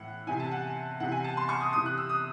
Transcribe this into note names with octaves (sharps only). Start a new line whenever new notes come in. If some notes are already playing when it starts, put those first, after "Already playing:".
Already playing: A2 E3 F#5
C3 E3 G#5
A5
F#5
C3 E3 F#5
G#5
A5
C6
C#6
D#6
C3 E3 D#6
F#6
E6
D#6